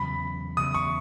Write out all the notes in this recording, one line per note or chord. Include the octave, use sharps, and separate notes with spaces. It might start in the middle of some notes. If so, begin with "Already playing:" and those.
Already playing: E2 C#3 F#3 B5
E2 C#3 F#3 D#6
C#6